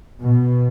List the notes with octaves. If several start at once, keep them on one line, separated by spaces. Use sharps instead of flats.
B2